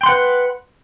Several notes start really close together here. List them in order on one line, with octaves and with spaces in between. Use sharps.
G5 C6 F#5 B4